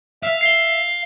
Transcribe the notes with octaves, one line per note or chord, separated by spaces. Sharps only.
E5 F5
E5 C7 G7